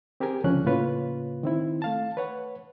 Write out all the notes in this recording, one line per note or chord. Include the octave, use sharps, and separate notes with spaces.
C4 G4 G#4 A#4 G#5
C#2 D3 F3 C#4 F#6
A2 C#3 A#3 F4 B4 C#5
D#3 C4 E4
A3 F5 A5
B4 C#5 F#5